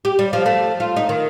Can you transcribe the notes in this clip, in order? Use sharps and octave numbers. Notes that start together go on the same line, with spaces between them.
G4
G3
F3
A3
F4
D#4
D#3